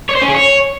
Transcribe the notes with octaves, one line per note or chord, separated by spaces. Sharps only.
C#5
C5
C#4
G#4
C#5